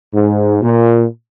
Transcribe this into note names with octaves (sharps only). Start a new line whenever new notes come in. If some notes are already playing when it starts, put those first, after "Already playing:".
G#2
A#2